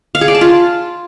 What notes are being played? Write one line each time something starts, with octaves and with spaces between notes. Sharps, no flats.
F5
G#4
D5
A5
F4